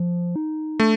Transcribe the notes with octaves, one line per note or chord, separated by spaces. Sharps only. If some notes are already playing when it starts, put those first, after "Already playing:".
Already playing: F3
D#4
A3 D4